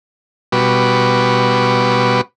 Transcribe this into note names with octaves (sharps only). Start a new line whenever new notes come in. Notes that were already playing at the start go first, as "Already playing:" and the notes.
B2 G3 F#4 B4 C#6 D6